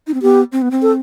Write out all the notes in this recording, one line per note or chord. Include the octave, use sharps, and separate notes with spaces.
D#4
C4
B3 G4
C4
B3
C4
A4